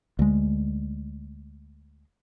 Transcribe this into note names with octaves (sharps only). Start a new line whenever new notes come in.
D2 G#3